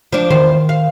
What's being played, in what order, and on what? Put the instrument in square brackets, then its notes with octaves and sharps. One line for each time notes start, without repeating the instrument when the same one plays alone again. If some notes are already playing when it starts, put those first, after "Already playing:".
[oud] F3 D4
[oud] E2 C5 [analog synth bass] D#3
[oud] F5